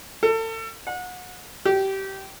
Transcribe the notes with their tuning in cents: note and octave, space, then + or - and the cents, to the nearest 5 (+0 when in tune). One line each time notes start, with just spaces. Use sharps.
A4 +35
F#5 -30
G4 -20